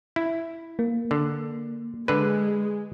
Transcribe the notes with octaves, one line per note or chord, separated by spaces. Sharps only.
E4
A#3
D3
D3 G#3 B4